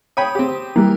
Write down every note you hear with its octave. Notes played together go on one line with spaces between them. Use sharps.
C#5 G5 B5 D#6
C4 G4
E3 G3 A#3